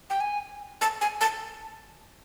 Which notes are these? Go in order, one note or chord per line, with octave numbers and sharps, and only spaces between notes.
G5
G#5
A5
G#5
A5